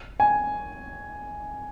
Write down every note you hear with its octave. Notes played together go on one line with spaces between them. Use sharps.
G#5